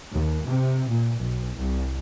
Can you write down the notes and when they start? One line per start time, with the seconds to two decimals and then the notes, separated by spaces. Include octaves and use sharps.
0.11 D#2
0.46 C3
0.87 A#2
1.17 B1
1.55 C2